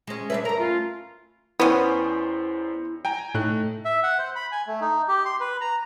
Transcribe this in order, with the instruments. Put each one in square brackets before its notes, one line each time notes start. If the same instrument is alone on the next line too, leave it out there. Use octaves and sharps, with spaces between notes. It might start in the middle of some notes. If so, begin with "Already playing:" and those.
[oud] G#3 C#4
[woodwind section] G3 C#5 E5 [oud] D4 A4 B4
[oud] G2 A#4 [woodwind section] A4 E5 A#5
[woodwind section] A3 C#4 F4
[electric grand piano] E2 C5 G5 [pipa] B3 C#4 [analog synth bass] E4
[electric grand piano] G5 G#5 A#5
[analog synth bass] A2 [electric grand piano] A3 D#4 F#6
[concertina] E5
F#5
C5
B5
G#5
A3
D#4
G4
C6
B4
A#5